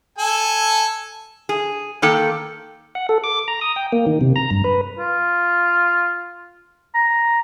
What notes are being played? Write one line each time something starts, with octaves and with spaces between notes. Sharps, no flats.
A4 G#5
G#4
D#3 A#3 A4 G5
F#5
A4
D6
A#5
D#6
G5
A#3
D#3
C3
A#5
G2
B4
F4
A#5